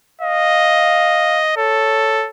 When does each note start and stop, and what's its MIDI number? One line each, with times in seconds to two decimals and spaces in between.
0.21 1.55 75
0.21 1.42 77
1.57 2.28 69
1.57 2.28 73